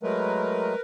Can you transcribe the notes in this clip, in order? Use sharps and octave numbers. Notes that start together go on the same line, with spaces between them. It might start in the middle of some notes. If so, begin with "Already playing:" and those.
F#3 G#3 A3 A#4 B4